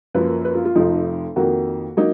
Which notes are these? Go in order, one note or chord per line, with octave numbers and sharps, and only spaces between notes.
F#2 F3 A#3 B4
B4
F4
F4
F1 F2 F3 D#4
F2 D#3 A#3 F#4
F#3 A#3 D#4